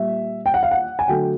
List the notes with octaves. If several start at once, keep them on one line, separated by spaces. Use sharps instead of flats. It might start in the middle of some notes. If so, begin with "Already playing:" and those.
Already playing: A#2 G3 E5
G5
F#5
F5
F#5
G#5
D3 F#3 A3 G5